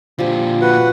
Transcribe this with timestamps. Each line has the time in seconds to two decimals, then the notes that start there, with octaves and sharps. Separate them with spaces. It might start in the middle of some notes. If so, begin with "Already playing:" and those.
0.19 A#2 D3 F3 G3
0.61 F#4 B4 F#5